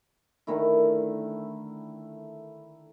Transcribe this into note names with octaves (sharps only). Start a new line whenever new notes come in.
D3 D#3 A3 E4